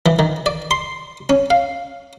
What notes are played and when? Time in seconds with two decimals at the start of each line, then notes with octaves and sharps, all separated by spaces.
0.06 E3
0.19 D#3
0.46 D5
0.71 C6
1.30 C#4
1.50 F5